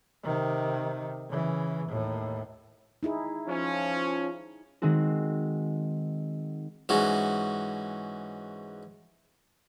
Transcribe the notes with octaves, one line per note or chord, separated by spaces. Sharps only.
C3 D#3
C#3 E3
D#2 A2
D#4 E4 G#4
F3 C#4
D#3 G#3 C4 F#4
G#2 E3 C#4 F#4